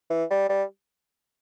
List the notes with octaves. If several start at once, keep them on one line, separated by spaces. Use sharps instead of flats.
E3
G3
G3